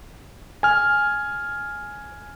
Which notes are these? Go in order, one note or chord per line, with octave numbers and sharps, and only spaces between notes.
G#5 F6